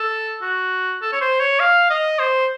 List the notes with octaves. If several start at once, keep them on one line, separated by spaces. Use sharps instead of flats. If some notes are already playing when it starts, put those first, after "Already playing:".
Already playing: A4
F#4
A4
C#5
C5
C#5
F5
D#5
C5